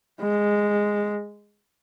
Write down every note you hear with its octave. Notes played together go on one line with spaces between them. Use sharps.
G#3